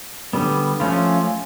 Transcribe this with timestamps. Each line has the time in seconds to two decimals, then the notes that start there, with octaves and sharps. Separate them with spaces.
0.33 D3 G3 B3
0.80 F3 A3 C#4 F4